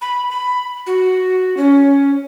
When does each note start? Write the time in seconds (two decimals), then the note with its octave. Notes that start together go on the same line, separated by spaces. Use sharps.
0.02 B5
0.30 B5
0.87 F#4
1.57 C#4